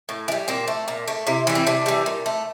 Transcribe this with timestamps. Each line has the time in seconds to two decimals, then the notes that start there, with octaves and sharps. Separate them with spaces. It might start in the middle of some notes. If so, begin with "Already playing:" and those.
0.09 A2
0.28 E3
0.32 G3
0.48 A#2 C4
0.68 A3
0.88 A#2
1.08 A3
1.27 C3 E4
1.47 E3 G3
1.55 C4
1.67 C3 D4
1.86 E3 G3
2.06 A#2
2.26 A3